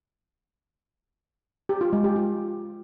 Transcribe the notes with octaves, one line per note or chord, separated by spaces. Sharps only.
G4
F4
G#3
G4
F4